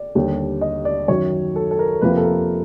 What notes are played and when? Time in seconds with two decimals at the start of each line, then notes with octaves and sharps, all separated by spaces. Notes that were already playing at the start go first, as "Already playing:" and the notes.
Already playing: D5
0.15 D#2 D3 G3
0.61 D#5
0.85 D5
1.08 F#2 D#3 F#3 C#5
1.56 A4
1.71 A4
1.79 A#4
2.01 F2 C3 F3 A#3 B4
2.10 A#4
2.17 A4
2.25 A#4